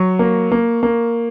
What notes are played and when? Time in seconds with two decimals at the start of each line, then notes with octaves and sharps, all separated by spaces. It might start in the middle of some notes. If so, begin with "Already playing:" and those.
Already playing: F#3 C#6
0.19 A#3
0.52 A#3
0.83 A#3